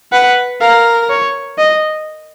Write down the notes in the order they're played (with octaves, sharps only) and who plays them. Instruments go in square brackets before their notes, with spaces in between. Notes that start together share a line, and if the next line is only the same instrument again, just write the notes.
[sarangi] B4 [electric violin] F#5
[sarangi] A#4 [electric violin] F5
[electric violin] C#5
D#5